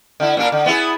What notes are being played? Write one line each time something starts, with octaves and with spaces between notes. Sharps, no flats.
D3 E4
A#2 D4 A#4
D3
B3 E4 G#4